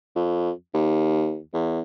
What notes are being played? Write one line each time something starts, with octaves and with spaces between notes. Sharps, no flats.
F2
D#2
E2